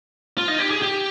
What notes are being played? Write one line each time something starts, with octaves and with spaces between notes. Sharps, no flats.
F4
D#4
G4
G#4
G4